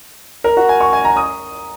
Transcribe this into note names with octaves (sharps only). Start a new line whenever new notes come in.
A#4
F#4
G#5
C#6
G#5
A#5
D#6